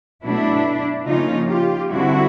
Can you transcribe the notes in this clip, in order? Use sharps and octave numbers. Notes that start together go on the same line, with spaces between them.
B2 F#3 A3 D4 E4
C#3 F3 A#3 C#4 D#4 F4
F4 G4
D3 G3 C4 E4 F#4